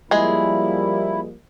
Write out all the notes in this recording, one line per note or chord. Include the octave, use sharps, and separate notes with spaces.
F3 G3 G#3 A#3 E4 G#4